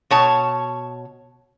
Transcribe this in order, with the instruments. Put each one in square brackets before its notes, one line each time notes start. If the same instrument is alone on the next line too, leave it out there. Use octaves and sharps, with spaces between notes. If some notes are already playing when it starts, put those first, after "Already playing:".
[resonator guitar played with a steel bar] B2 C#5 A5